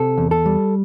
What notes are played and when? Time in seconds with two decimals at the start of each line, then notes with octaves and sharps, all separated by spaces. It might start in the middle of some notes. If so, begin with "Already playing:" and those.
Already playing: C3 A4
0.18 E2
0.31 A4
0.46 G3